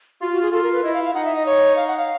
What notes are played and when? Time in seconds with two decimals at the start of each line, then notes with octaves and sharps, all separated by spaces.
0.21 F4 F#4
0.32 F#4
0.42 G#4
0.52 F4 A4
0.63 A#4
0.73 B4
0.83 E4 D#5
0.93 F5
1.04 F5
1.14 D#4 F#5
1.25 E5
1.36 D#5
1.46 C#5
1.76 F5
1.87 F#5
1.97 F5